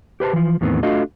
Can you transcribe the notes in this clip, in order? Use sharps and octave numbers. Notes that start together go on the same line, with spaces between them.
G4 B4 C5 A5
E3 F3
E2 A2 D#3 B3 C4
A3 D4 F4 F#4 D#5